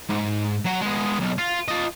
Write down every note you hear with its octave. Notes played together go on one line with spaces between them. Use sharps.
G#2
F#3 F#4
G#3 B3
B1
F4
F4 D#5